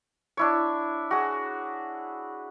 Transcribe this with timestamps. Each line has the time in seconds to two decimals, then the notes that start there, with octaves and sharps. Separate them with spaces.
0.37 D4 E4 C#5
1.11 F#4 G#4